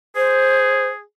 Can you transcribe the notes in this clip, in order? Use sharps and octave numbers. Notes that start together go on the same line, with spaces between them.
G#4 C5